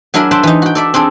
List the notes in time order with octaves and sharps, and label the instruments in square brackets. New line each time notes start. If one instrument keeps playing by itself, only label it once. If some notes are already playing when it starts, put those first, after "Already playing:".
[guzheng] F#3 D4 E4 A#4 E5 G#5
C5 E5 F#5 G5 A5
E3 D#4
F#4 G5
A4 D5 E5
C4 D4 G#4 A4